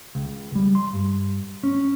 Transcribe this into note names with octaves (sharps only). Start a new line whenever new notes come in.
C#2
G3
C6
G2
C#4